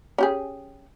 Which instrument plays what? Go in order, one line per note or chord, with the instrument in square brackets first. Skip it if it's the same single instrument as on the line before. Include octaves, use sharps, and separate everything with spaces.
[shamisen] C#4 G4 G#4